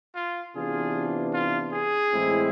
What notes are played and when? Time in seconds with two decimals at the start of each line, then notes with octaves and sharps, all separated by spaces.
0.16 F4
0.56 C3 E3 B3 D4 F4 G#4
1.34 F4
1.73 G#4
2.13 A2 E3 G#3 C4 E4